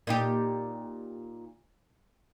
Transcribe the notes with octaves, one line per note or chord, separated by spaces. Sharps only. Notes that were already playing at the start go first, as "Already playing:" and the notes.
A#2 D#4 G4